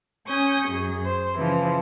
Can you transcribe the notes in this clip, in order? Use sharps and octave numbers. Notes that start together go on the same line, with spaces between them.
C#4 G#5 C#6 D#6 G6
F#2 G#4
C5
C#3 E3 F3